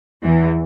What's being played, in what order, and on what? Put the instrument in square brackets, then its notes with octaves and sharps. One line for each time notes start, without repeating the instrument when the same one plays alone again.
[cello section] E2 E3